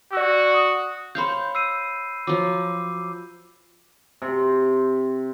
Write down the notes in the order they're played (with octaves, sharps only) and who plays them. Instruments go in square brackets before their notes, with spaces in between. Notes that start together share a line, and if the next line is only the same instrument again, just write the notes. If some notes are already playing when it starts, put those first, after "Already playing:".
[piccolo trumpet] F#4 [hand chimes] D5 E6
[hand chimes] D#6
[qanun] C5 C#5 F5 [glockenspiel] B5 G6
[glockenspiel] E6 C7 D#7
[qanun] F3 F#3 [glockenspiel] D6
[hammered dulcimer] C3